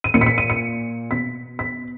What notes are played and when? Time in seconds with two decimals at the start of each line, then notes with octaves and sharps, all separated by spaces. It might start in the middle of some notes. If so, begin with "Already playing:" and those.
0.04 D#7
0.14 A#2 C#7
0.21 B6
0.26 C#7
0.38 D#7
0.50 C#7
1.11 B2 B6
1.59 B6